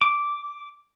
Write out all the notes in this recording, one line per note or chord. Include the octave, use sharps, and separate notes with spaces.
D6